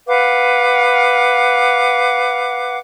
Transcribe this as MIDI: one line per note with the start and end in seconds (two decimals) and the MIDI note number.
0.07 2.78 71
0.07 2.78 77
0.07 2.78 78
0.07 2.78 86